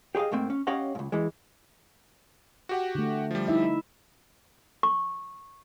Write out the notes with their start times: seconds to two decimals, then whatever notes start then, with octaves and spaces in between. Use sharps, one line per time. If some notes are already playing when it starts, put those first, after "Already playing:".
0.15 G4 G#4 D5 D#5 F5
0.32 G#2 A3 A#3 C4
0.50 C#4
0.67 C#4 G4 C#5 D#5 F5 F#5
0.95 C#2 G#2
1.12 E3 G#3
2.69 F#4 G4 F#5
2.95 D3 A3
3.31 F3 G3
3.48 D#4 E4 E5
4.83 C#6